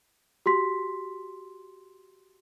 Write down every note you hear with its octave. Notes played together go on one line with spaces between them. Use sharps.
F#4 G4 C6 B6